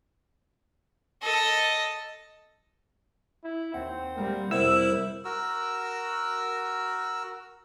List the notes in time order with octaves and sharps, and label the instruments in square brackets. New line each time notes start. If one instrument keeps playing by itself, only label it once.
[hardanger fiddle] A4 D#5
[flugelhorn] E4
[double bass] D#2 [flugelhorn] C4 [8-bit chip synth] F#5
[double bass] G3 A#3
[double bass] F2 C3 [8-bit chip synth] G3 A#4 C5 [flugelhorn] E4 [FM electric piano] E6
[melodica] F#4 A#4 E6